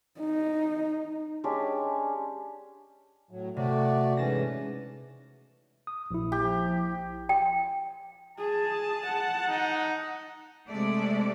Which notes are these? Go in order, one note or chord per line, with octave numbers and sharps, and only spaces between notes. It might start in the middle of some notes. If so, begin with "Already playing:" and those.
D#4
G#3 C#4 D4 G4
A2 F#3
C3 A3 F#4 D5
G#2 E3 C#4 A5 A#6
D#6
A#1 E4
F3 G4
G5
G#4 A5
F#5
D#4
C3 G#3 A3 D5